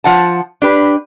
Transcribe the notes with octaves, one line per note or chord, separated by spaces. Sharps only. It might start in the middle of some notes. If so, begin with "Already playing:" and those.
F3 F#5 A5
D4 G4 B4